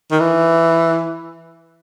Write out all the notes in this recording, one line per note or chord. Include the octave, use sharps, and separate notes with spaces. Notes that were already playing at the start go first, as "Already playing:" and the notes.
D#3
E3